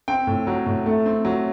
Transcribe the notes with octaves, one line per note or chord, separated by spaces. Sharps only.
C4 G5
A2
F#3
A2
A3
C4
F#3